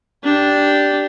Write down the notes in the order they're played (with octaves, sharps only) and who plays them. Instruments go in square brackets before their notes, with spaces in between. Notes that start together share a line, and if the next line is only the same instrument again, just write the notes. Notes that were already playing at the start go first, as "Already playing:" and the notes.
[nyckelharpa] D4 G4